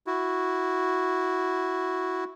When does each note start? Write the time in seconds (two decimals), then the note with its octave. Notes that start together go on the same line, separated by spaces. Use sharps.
0.07 E4 F#4